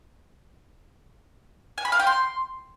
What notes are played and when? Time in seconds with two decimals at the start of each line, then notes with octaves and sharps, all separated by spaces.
1.78 G#5
1.85 B5
1.92 F5
1.99 G5
2.07 C6